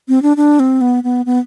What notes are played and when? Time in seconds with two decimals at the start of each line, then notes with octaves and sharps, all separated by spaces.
0.08 C4
0.22 D4
0.37 D4
0.59 C4
0.81 B3
1.03 B3
1.26 B3